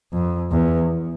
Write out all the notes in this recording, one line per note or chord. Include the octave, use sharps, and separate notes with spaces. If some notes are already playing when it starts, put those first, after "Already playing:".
F2
E2